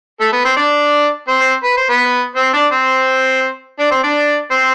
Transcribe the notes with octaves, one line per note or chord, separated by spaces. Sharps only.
A3 A4
B3 B4
C4 C5
D4 D5
C4 C5
B4
C5
B3 B4
C4 C5
D4 D5
C4 C5
D4 D5
C4 C5
D4 D5
C4 C5